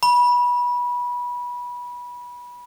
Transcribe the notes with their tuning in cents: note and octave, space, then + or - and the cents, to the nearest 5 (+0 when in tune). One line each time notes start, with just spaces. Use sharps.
B5 -20